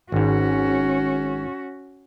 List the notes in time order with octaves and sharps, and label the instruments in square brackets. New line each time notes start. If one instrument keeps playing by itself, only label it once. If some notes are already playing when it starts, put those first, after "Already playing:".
[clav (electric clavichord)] G#1 G#2 [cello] C#4 F#4